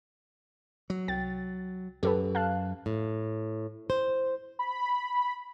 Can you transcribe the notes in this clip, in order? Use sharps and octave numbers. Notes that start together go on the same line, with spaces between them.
F#3
C2 G5 A6
F#2 G4 A4 B4
F5 A5 F#6
A2
C5
B5